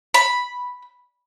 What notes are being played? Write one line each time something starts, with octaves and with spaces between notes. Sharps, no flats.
B5